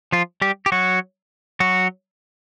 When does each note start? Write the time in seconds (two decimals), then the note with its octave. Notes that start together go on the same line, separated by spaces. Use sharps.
0.12 F3 F4
0.42 G3 G4
0.66 G4
0.72 F#3 F#4
1.60 F#3 F#4